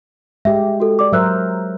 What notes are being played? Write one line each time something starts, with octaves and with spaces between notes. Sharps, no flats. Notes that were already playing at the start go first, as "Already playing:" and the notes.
G#3 G4 E5
F#4 A4
D5 D6
F#3 A#4 C5 E5 E6 F#6